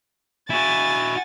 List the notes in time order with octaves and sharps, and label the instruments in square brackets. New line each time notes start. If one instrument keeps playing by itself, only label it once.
[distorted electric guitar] E4 F#4 [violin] G#5 A6